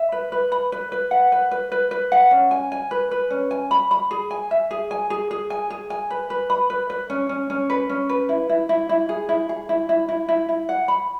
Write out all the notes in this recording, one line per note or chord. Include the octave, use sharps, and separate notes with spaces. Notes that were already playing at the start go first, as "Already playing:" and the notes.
Already playing: E5
B4
B4
B5
B4
B4
F#5
B4
B4
B4
B4
F#5
C#4
G#5
G#5
B4
B4
C#4
G#5
B5
B5
G#4
G#5
E5
G#4
G#5
G#4
G#4
G#5
G#4
G#5
B4
B4
B5
B4
B4
C#4
C#4
C#4
B4
C#4
B4
E4
E4
E4
E4
G#4
E4
G#4
E4
E4
E4
E4
E4
F#5
B5